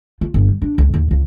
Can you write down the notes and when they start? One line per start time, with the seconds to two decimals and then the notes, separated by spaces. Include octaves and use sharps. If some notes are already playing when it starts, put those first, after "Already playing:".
0.21 F4
0.34 G1
0.49 G3
0.62 D4
0.78 C#2
0.94 D#2
1.11 C#2